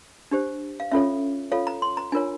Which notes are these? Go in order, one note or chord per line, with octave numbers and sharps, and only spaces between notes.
D4 G4 C5
F5
C#4 F4 A4 C#5 E5
F4 A4 C#5 F5
A#5
C6
A#5
D4 F4 A#4 C#5 G#5